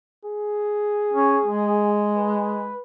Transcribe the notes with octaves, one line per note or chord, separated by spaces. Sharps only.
G#4
C#4
G#3
B4